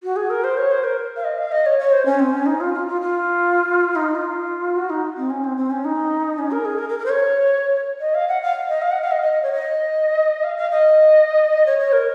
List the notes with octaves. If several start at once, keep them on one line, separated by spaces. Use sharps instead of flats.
F#4
G#4
A#4
C5
C#5
C5
A#4
F5
D#5
F5
D#5
C#5
C#5
C5
C#4
C4
C#4
D#4
F4
F4
F4
F4
D#4
F4
F#4
D#4
C4
C#4
C4
C4
C#4
D#4
C#4
A#4
G#4
A#4
A#4
A#4
C5
C#5
D#5
F5
F#5
F5
D#5
F5
F#5
F5
D#5
D#5
D#5
C#5
D#5
F5
F5
D#5
C#5
C#5
A#4